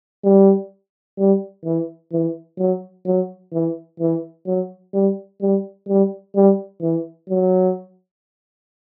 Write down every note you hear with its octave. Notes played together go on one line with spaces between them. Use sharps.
G3
G3
E3
E3
F#3
F#3
E3
E3
F#3
G3
G3
G3
G3
E3
F#3